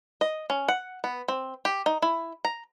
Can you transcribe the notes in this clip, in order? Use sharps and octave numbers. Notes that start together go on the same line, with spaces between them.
D#5
C#4
F#5
B3
C4
G4
D#4
E4
A#5